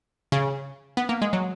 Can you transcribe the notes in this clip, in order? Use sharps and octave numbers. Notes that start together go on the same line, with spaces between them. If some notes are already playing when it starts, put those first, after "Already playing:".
C#3
B3
A#3
G#3
F#3